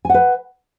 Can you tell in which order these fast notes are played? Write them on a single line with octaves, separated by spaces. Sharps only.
G#5 F#5 B4